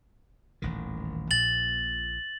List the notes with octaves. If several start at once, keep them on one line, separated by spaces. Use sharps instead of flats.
D#1 A1 D#3
A#1 A#2 A6 F#7